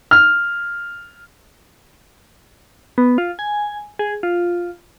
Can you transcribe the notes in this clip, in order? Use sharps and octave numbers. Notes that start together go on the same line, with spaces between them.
F6
B3
F4
G#5
G#4
F4